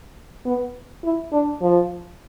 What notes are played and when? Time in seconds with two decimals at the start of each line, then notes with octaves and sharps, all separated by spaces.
0.45 B3
1.04 E4
1.32 D4
1.61 F3